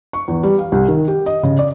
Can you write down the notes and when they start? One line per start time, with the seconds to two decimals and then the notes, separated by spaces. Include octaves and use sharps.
0.13 C#6
0.28 E2
0.43 G3
0.59 F5
0.72 C2
0.88 D#3
1.08 G4
1.26 D#5
1.43 C#3
1.59 D5